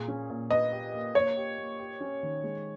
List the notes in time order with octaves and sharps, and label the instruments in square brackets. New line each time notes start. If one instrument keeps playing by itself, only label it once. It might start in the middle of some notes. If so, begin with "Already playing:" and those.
Already playing: [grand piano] A#2 G#4
C#4
A#2
[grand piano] B4 [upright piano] D#5
[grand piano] G4
A#3
[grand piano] A#3 [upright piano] C#5
[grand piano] G4
A#3
G4
C#4
D#3
G#3